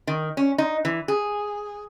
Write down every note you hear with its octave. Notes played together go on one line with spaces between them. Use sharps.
D#3
C#4
D#4
E3
G#4